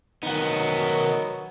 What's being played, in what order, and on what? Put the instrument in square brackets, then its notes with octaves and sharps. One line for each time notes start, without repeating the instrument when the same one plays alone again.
[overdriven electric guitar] D#3 B3 [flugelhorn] F#3 [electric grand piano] D#4 F#5